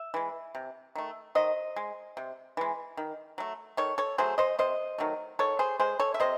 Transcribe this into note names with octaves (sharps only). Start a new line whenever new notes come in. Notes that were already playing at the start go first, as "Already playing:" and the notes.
Already playing: E5
E3 G#3
C3
D#3 A3
D#3 C5 D#5
G#3
C3
E3 G#3
D#3
F#3 A3
D#3 A4 C#5
A4 C#5
F#3 A3 G#4 C5
C5 D#5
C3 C5 D#5
D#3 F#3 A3
D#3 A4 C#5
G#4 C5
G#3 G#4 C5
A4 C#5
E5
C3 C5 D#5